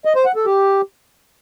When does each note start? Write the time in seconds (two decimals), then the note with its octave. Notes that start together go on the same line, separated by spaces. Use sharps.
0.05 D#5
0.15 C5
0.25 F#5
0.36 A4
0.46 G4